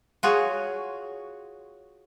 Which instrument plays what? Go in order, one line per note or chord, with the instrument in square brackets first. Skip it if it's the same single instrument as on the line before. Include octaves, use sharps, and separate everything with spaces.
[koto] F4 F#4 G#4 C#5